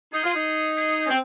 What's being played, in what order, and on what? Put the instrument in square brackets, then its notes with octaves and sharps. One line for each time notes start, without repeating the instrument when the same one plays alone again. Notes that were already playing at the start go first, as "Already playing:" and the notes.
[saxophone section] D#4 [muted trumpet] G#4
[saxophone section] F4
D#4
[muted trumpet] G#4
[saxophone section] C#4
C4